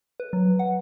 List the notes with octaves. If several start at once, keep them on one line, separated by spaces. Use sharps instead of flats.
B4
F#3
F#5